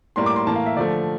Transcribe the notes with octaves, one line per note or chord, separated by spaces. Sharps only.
A2 G3 A#3 C6
D6
C6
A2 E3 A#3 A5
F5
E5
D3 F3 A3 D5